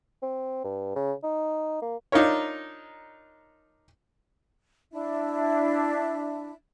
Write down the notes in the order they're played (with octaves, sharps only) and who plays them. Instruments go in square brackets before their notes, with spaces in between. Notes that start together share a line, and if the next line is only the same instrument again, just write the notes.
[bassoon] C4
G2
C#3
D#4
A#3
[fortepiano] D4 D#4 F4 A#4 C#5
[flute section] D4 E4 E5